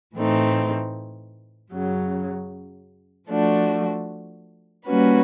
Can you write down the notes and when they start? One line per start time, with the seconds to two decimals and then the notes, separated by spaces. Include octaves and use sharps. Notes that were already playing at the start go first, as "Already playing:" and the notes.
0.16 A2 E3 A3 C4 D#4
1.73 F#2 C#3 F#3
3.29 F3 A3 D4 F#4
4.86 G3 A#3 C#4 F#4 B4